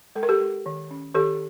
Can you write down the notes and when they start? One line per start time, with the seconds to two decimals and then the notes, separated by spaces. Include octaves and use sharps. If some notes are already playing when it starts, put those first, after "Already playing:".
0.15 G#3 A4
0.23 A#4
0.29 G4 A4
0.41 G#3
0.66 D#3
0.91 C#4
1.15 D#3 G4 A4